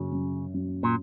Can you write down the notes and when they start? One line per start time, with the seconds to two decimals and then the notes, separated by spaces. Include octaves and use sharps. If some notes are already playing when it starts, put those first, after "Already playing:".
Already playing: F#2 C#3
0.12 F#2
0.54 F#2
0.83 A#2